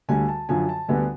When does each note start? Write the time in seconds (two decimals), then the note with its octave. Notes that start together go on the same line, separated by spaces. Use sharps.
0.09 D2 D3 G3 G#5
0.28 A5
0.49 F#2 D3 F3 G#5
0.69 A5
0.88 D2 D3 G3 B3 D4 G#5